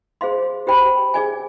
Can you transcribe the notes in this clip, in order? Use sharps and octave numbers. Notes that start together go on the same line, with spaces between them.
G#4 C5 F5 C6
G4 C5 G5 B5
G#4 D5 G#5